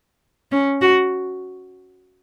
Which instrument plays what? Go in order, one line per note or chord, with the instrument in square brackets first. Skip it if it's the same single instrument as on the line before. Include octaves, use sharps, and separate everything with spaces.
[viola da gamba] C#4
F#4